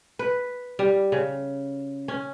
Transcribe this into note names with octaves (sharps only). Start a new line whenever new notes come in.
B4
G3
C#3
C#4